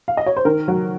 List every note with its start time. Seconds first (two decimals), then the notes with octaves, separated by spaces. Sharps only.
0.08 F5
0.17 D#5
0.26 C#5
0.37 C5
0.45 D#3 A#4
0.68 F#3